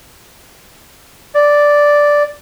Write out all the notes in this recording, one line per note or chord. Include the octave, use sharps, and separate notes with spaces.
D5